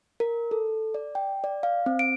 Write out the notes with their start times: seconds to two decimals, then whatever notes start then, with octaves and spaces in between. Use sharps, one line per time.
0.20 A#4
0.51 A4
0.94 D5
1.15 G5
1.44 D5
1.63 F5
1.86 C4
1.99 D7